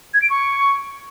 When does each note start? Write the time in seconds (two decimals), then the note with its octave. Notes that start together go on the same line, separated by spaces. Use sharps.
0.14 G#6
0.22 D7
0.30 C#6